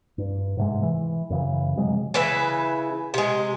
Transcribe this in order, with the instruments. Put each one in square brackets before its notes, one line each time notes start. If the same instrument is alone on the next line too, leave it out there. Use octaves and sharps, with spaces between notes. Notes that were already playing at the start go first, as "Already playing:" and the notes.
[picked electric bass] G2
G#2 C3 G#3
E3
F#2 C#3 E3
C3 F#3 G#3
[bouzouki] C#3 E3 B4 E5
C3 G#3